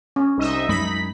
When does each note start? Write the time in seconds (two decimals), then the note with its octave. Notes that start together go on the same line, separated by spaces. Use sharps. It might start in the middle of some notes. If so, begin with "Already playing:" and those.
0.16 C#4
0.37 C2 D#4 D#5 E5
0.69 F#2 G#3 B5 B6